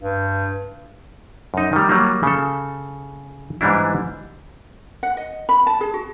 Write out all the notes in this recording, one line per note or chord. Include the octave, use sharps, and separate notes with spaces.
G2
F#2 D#4
D#3 G3
F#3 G3 A#3
C#3 A4
G#2 E3 G3 D4 E4
F#5
D#5
B5
A5
G#4
F#4